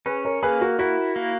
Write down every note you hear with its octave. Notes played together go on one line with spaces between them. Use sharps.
C#4 G#4 B4
A#4 C#5
A#3 G#4 B4
F#4 A#4
E4 F#4 A#4
A#3